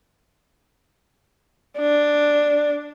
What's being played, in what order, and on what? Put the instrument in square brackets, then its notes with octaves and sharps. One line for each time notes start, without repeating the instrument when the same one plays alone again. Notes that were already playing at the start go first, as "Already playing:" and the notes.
[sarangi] D4